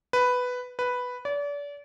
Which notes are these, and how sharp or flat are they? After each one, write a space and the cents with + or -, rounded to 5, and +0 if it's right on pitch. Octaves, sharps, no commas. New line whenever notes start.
B4 +5
B4 +0
D5 -35